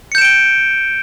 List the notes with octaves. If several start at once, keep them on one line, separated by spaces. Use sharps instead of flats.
G6 C#7 D7 E7 G7